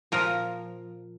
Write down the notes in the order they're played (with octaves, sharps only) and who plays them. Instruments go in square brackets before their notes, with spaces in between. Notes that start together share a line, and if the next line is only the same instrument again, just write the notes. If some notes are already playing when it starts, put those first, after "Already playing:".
[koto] A#2 F3 A#4